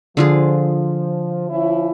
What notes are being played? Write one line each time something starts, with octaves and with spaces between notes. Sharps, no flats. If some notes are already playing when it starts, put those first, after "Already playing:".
D3 F3 F4 G#4
F3 C#4 E4